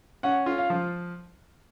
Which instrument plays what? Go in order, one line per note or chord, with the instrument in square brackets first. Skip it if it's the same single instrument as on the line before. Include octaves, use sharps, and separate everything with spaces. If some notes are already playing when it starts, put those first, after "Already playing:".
[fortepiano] C#4 [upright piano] F#5
[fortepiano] F4
[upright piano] F5
[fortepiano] F3